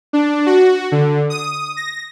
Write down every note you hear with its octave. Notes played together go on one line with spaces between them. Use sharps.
D4
F#4
D3
D#6
A#6